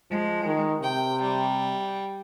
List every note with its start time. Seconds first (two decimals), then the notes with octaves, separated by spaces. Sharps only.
0.11 F3 G#3
0.45 D#3
0.82 C3 G5
1.21 G3